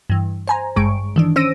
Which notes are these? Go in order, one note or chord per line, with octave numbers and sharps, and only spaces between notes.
G2 E3
C5 G#5 A#5
G#1 G2 G#3 C#6 D7
D#3 E3 D4
C#4 C5 E6 A#6 D7 D#7